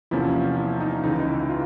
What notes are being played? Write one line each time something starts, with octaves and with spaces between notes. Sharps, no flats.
E2 C3 F3 A#3 C#4 E4
E4
D#4
C#2 C#3 E3 D#4
D#4
E4
F4